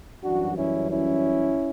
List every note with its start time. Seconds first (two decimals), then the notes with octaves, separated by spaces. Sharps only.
0.24 F#2 E3 G3 D4 F#4
0.57 C#4 E4
0.90 C#4 E4